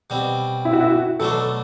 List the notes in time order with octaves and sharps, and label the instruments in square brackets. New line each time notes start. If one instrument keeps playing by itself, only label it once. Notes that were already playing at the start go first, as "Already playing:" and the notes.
[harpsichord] B2 G3 C4
[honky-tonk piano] E4
F#4
E4
F#4
[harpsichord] B2 F#3 A3 D4 [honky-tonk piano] A4